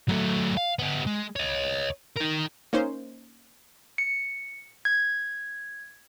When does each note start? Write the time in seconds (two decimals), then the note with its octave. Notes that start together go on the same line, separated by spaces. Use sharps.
0.08 F#3 A3
0.57 F5
0.79 B3 G4
1.06 G#3
1.36 C#5 D#5
2.16 D#4 A#4
2.73 A#3 C#4 D#4 C5
3.98 C#7
4.85 G#6